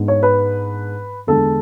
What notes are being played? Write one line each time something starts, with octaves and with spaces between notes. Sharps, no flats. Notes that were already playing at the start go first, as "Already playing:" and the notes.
Already playing: G#2 G#3 B3 D4
C#5
B4
E2 D3 G#3 A4